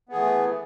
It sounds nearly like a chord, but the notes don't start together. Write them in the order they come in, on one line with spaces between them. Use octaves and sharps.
B3 G#4 E3 A3